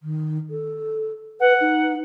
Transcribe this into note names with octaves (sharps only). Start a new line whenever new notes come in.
D#3
A4
B4 F#5
D#4